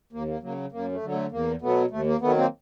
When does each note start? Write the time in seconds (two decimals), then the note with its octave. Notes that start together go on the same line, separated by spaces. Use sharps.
0.12 D#2 A#3
0.28 A#3
0.42 C#3 F#3 A#3
0.72 F#2 A#3
0.92 A3
1.03 D3 F#3
1.12 A3
1.31 E2 A#3
1.61 B2 F#3 A3 B3
1.91 D#2 A3
2.06 A#3
2.21 D#3 F#3 A3 B3
2.36 A#3 C4